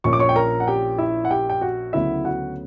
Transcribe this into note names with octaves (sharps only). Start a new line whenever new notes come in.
A#1 A#2 A#3 C#4 C#6
D6
C#5 C#6
G5
A#4 A#5
F#5
G4 G5
E4 E5
F#5
G4 G5
G5
F#4 F#5
D2 C#3 F#3 B3 E4 E5
F#4 F#5